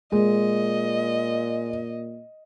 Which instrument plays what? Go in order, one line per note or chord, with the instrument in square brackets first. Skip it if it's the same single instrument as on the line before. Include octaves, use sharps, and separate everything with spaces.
[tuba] A#2 [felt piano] G#3 [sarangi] D#5